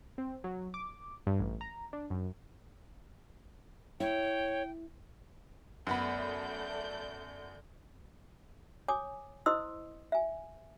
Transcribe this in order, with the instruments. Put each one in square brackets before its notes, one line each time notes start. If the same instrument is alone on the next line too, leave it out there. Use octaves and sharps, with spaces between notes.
[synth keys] C4
F#3
D6
G2
A1
A#5
D4
F#2
[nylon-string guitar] E4 [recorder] C#5 [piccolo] G5
[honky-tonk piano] F#2 B3 B5 [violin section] A3 D5 G6
[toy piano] C#5 G#5 D6 D#6
E4 C5 D#5 C6 D#6 E6
E5 G#5